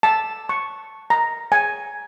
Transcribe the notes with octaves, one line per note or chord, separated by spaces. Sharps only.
A5
C#6
A#5
G#5